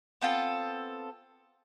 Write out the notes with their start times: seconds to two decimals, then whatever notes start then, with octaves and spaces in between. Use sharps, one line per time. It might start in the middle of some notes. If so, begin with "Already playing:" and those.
0.21 B3 C4 F4 A4